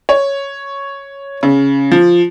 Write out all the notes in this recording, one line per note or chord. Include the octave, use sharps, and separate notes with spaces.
C#5
C#3
F3